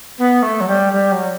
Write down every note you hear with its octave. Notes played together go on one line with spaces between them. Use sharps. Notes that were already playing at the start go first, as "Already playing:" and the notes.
B3
A3
F#3
G3
G3
F#3